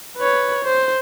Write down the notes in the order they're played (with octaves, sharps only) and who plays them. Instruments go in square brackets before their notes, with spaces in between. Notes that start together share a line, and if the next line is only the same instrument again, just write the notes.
[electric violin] B4 C#5
C5